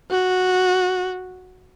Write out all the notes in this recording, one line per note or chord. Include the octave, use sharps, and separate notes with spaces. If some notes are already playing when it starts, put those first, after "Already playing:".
F#4